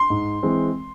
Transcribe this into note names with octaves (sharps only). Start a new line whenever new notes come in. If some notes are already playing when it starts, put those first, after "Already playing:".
Already playing: C6
G#2
E3 G#3 C4